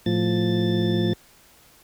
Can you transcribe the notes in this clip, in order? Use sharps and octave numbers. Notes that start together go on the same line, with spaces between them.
A2 F3 A6